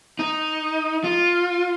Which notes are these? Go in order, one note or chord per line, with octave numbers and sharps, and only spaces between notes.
D#4
F4